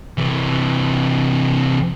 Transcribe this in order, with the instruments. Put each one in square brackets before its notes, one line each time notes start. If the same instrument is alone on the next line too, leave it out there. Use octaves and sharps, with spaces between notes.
[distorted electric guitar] C3 E3